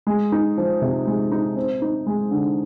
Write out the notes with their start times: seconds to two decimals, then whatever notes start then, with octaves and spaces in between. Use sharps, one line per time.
0.07 G#3
0.32 D#4
0.57 F3
0.82 C3
1.07 G#3
1.32 D#4
1.56 C4
1.82 D#4
2.07 G#3
2.31 D3